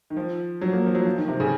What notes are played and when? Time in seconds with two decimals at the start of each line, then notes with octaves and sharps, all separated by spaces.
0.10 D#3
0.17 F3
0.61 F#3
0.73 A#3
0.86 F3
0.95 F#3
1.05 F3
1.17 D#3
1.28 C3
1.40 C#3